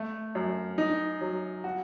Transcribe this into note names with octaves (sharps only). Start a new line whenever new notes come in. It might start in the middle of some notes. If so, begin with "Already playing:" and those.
Already playing: A3
F#2
D#4
F#3
F#4